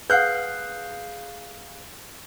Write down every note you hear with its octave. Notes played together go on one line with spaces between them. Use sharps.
G#4 B4 F5 F#5 F#6 G6